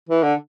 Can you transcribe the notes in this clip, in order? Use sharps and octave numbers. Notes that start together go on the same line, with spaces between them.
E3
D3